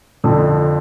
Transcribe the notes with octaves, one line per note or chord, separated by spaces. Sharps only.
F2 D3 F3